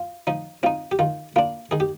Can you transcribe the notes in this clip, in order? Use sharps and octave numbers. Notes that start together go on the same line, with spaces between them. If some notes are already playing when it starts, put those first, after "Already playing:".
Already playing: F4
F3 D#4
C4 D#4 F4
G4
D#3 F4
A#3 D4 F4
D#3 G#4
G4